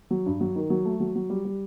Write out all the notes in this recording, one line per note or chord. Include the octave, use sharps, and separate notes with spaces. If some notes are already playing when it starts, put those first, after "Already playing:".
F#3
G2
F#3
D#3
F#3
A3
F#3
F#3
G3
G3